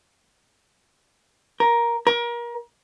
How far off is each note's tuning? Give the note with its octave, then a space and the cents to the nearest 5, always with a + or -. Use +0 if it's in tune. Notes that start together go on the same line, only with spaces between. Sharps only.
A#4 +10
A#4 +30